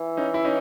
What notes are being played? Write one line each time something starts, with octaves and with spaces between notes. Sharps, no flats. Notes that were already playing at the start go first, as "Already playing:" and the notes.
Already playing: E3
C#4 D#4
E4
C#4 D#4